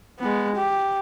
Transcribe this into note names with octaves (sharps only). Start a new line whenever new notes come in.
G#3 B3
G4